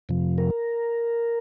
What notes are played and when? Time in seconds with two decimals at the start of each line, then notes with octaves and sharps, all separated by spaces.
0.09 F2 C3 F3
0.38 A#4